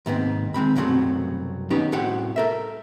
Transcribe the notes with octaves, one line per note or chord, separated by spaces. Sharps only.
D#2 G#2 B3 C4
D#3 G#3 C4 B5
C2 F#2 B2 F#3 A3 C4
D#3 B3 C#4 D#4 G4
C2 A2 F#4 G4 C5 F#5
A4 A#4 E5